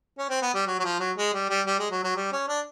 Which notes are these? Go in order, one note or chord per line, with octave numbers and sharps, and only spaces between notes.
C#4
C4
B3
G3
F#3
F#3
F3
F#3
G#3
G3
G3
G3
G#3
F#3
F#3
G3
C#4
D4